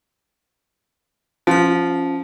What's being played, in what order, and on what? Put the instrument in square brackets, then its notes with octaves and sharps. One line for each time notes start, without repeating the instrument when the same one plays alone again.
[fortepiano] F3 [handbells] C#4 F6